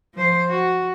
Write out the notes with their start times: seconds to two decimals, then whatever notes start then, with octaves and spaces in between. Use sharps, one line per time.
0.14 F3 C5
0.49 F#4